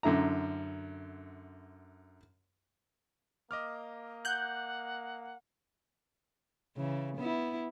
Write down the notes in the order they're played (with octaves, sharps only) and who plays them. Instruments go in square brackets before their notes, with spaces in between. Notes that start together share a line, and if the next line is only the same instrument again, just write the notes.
[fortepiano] F#2 D3 E4 A#5
[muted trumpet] A#3 [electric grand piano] D#5 D6 F6
[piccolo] F#5 [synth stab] F#6 G6
[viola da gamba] C#3 E3
B3 E4